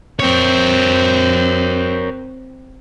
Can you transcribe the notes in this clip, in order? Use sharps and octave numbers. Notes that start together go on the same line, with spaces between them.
C4 A#4 C#5